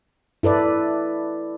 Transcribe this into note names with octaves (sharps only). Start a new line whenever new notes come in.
E4 A4 B4 D5